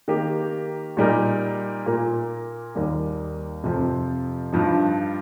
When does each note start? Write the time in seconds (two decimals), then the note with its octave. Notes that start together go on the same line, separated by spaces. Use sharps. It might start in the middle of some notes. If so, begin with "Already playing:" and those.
0.08 D#3 A#3 G4
0.97 A#2 G3 D#4 A#4
1.86 A#2 A#3 F4 A#4
2.75 D#2 D#3 G3 A#3
3.63 F2 C3 F3 C4
4.53 G2 F3 D#4